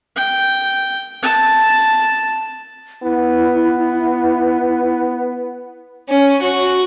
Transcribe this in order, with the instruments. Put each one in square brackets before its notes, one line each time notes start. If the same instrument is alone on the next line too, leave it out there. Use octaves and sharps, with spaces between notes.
[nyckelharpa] G5
A5
[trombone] B3 [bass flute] E4
[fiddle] C#4
F#4